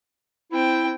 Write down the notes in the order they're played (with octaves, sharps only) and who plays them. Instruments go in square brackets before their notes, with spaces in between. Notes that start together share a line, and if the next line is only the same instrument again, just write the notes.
[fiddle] C4 G5 [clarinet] E4